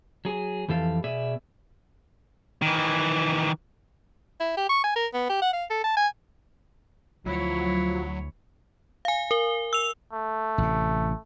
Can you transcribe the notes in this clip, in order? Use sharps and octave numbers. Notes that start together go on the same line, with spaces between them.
F#3 G#4
F2 E3 G4 A4 F5
B2 G#4 D5 E5
D#3 E3
E4
G4
C#6
G#5
A#4
B3
G4
F#5
F5
A4
A5
G#5
D2 F3 F#3 E4 C#5
F5 G#5
A#4 G7
E6 F7
A3
A1 C3